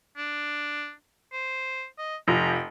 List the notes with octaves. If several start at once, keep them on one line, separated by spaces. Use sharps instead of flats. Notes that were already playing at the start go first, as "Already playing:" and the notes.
D4
C5
D#5
F1 F3 A#5